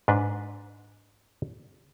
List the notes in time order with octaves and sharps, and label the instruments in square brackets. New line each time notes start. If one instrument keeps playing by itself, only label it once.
[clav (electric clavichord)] G#2 D4 B4